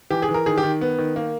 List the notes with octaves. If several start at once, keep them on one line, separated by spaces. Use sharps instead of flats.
E3 G4
G#4
E3
A#4
D#3 G#4
G4
D#3
B3
D#3
A#3